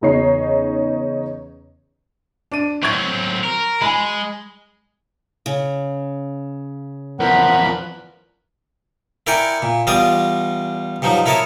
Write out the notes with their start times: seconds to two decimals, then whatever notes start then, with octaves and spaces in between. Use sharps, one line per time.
0.01 E2 C#3 D#4 C#5 C7
2.52 D4 D#7
2.83 F#3 C4 C#6 G#6
3.44 A#4
3.82 G#3 G#5 B5
5.46 C#3
7.20 E2 F3 A#4 B4 F#5 B5
9.27 E4 A#4 D5 G5 G#5 C#6
9.62 A#2
9.87 E2 G3 F4 D5 D#5 D#6
11.02 G2 F3 F#3 D#4
11.26 E4 A#4 C#5 D#5 A5